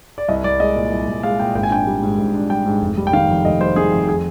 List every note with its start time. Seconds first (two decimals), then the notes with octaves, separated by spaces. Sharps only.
0.18 D5
0.28 C2 D#5
0.44 C2 D5
0.60 G#3 D#5
0.76 A#2
0.92 C2
1.08 C2
1.23 G#3 F5
1.40 A#2 G5
1.55 G#1 G5
1.63 G#5
1.71 D4 G5
1.87 G3
2.02 G#2
2.18 G#1
2.34 D4
2.50 G3 G5
2.65 G#2
2.81 F1
2.97 G3
3.07 G5
3.13 D#3 F5
3.29 F2
3.45 F1 D#5
3.61 G3 C5
3.76 D#3 G#4
3.92 F2
4.09 G#4